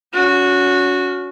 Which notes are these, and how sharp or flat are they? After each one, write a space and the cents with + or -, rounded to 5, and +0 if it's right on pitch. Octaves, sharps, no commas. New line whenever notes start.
C#4 +35 F#4 -15